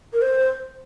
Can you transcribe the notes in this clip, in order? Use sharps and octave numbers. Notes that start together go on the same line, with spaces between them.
A#4
C5